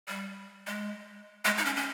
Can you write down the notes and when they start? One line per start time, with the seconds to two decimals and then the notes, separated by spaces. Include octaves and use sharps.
0.08 G3
0.67 G#3
1.45 G#3
1.58 D#4
1.66 C#4
1.76 C#4